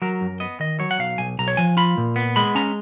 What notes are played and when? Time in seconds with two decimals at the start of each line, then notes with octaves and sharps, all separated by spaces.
0.02 F#3 A#4
0.21 F#2
0.40 B3 D#5
0.60 D#3 D#5
0.80 F#3 C#5
0.91 F#5
0.99 B1 F5
1.18 B1 G#5
1.39 B1 A#5
1.48 C#5
1.57 F3 G#5
1.77 F4 B5
1.97 A#2
2.16 B3
2.36 G#3 B5
2.55 C#4 A#5